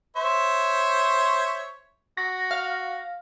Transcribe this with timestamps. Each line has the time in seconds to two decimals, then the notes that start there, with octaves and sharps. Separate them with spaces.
0.16 C5 C#5 E5
2.17 F#4 A#6
2.51 F5